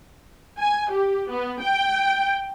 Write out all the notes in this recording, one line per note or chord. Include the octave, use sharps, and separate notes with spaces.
G#5
G4
B3
G5